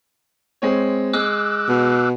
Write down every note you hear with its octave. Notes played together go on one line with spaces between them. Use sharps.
G#3 C4 C#5
G#3 D6 E6 F#6
B2